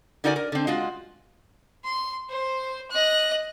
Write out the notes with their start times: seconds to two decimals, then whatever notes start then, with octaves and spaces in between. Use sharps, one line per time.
0.24 D3 D#4 F#4 A#4 D5 G#5
0.36 A#4
0.52 D3 C4
0.67 G#3 F4 F#4
1.85 C6
2.29 C5
2.91 D#5 F#6